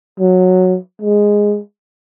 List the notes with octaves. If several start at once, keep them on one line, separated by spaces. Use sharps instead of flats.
F#3
G#3